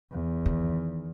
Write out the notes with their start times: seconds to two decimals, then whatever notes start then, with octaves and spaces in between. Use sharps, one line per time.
0.12 E2
0.46 D#3